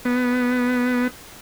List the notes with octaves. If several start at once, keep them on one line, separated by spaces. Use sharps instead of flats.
B3